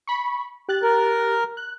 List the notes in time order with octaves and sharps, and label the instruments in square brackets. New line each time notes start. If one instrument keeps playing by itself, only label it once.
[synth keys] B5 C#6
G4 F#6 A6
[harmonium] A#4
[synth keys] F#6